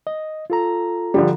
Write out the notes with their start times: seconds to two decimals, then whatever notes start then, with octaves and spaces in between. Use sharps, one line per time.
0.07 D#5
0.50 F4 A4 A#5
1.14 D3 F3 G3